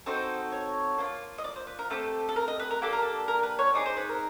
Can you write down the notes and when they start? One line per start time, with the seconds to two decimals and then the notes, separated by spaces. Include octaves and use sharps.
0.06 C4 D#4 F#4 A4 C5
0.52 C#5
0.98 A#3 D4 F4
1.38 D#5
1.44 D5
1.56 C5
1.67 B4
1.79 A#4
1.90 A3 C4 G4 A4
2.29 A4
2.36 A#4
2.48 D#5
2.60 B4
2.71 A#4
2.82 A#3 D4 G4 A4
2.93 A#4
3.03 A4
3.28 A#4
3.43 B4
3.59 C#5
3.74 C4 D#4 G#4 D5
3.85 C5
3.97 B4
4.09 A#4